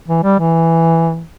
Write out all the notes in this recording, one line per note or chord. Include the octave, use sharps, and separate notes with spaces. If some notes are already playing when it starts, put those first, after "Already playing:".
E3
G3
E3